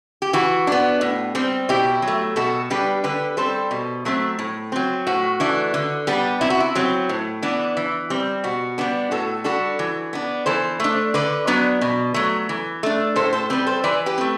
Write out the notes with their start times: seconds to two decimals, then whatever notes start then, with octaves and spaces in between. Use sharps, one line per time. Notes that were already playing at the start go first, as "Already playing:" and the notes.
0.22 G4
0.33 E3 F#4
0.67 B3 D4
1.01 A2
1.35 G3 C4
1.69 B2 E4 G4
2.02 F#3
2.08 A3
2.36 B2 F#4 A4
2.70 G3 D4 G4 B4
3.04 D3 G4 B4
3.37 G3 C4 A4 C5
3.71 B2
4.05 F#3 A3 C4
4.39 A2
4.72 F#3 C4
5.07 A2 F#4
5.40 E3 A3 D4
5.74 D3
6.07 G3 B3 D4
6.41 C3 E4
6.50 F#4
6.60 E4
6.75 F#3 C4
7.09 A2
7.42 E3 B3 D4
7.77 E3
8.10 G3 C4
8.44 B2 F#4
8.78 G3 B3 D4
9.11 A2 F#4 A4
9.44 G3 D4 F#4 A4
9.79 E3
10.13 B3 D4
10.46 E3 A4 C5
10.80 A3 D4
11.14 D3 B4 D5
11.47 F#3 B3 D4
11.81 B2
12.14 F#3 A3
12.49 E3
12.83 A3 D4
13.16 A2 A4 C5
13.33 A4 C5
13.50 G3 C4 G4 B4
13.67 A4 C5
13.84 E3 B4 D5
14.06 G4 B4
14.18 A3 C4